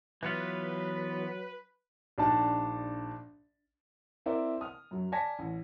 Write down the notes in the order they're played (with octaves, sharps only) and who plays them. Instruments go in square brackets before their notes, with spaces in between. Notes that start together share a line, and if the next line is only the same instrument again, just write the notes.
[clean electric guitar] E3 B3 F4 [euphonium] F#3 [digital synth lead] B4
[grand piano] A#1 D4 D#4 A5
[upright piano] C4 E4 A#4 C5 D5
D#6 F6
F#2 F#3
D5 G#5 A5 G#6 A#6 B6
A1